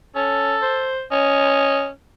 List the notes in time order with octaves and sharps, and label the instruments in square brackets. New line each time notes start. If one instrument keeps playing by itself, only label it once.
[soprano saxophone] C#4 [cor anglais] A4
[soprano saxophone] C5
[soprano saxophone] C#4 [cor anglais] D#5